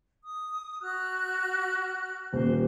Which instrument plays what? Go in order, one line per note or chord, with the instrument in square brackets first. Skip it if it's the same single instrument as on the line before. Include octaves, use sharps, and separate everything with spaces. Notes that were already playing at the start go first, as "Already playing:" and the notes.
[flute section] D#6
F#4 F6 F#6
[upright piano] D#1 [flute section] C5